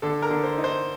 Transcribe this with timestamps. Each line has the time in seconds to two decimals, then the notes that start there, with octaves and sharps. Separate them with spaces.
0.02 D3 A4
0.22 A#4
0.30 D3
0.44 C5
0.58 D#4
0.64 C5